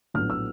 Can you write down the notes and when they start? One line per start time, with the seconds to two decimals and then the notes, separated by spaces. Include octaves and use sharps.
0.14 A#1 A2 F#3 B3 F6
0.30 E6